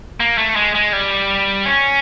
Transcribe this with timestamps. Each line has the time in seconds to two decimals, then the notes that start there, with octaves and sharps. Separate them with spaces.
0.20 A#3
0.38 A3
0.56 G#3
0.75 G#3
0.93 G3
1.65 C#4